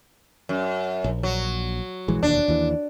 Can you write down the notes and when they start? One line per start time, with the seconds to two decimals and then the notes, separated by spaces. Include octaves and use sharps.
0.49 F#2
1.04 A#1
1.23 F#3
2.08 A#1 E3 G#3
2.23 E1 D#2 D4
2.48 D#2 E3